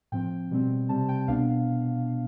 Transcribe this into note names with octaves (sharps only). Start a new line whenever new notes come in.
A2 F3 C4 G5
B2 G3 C4
C3 G3 C4 A5
G5
C2 B2 B3 D4 F5